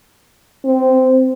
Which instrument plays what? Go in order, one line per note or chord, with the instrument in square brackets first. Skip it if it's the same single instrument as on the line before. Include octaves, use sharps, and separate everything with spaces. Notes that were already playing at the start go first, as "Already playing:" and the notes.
[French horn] C4